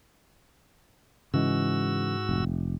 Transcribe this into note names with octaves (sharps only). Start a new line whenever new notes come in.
G#2 C#3 E3 G#3 F#4 E6
F1